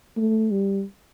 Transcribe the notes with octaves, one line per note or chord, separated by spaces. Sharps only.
A3
G3